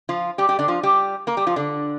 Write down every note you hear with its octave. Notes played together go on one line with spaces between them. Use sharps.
F3 F4
G3 G4
G3 G4
D3 D4
F3 F4
G3 G4
A#3 A#4
G3 G4
F3 F4
D3 D4